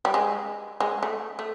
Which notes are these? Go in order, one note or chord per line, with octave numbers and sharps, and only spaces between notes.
G3
G#3
G#3
A3
A3